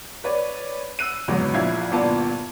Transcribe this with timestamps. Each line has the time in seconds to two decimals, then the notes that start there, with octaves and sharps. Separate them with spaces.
0.24 B4 C#5 D5
0.99 E6 F#6 D#7
1.28 F#1 E2 G#2 F#3 G#3 B3
1.54 A#1 F3 E4 F5 G#6 C7
1.91 G1 A#2 B3 F4 D5 A5